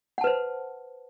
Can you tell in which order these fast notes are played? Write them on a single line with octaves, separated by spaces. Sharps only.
F#5 A5 B4 C5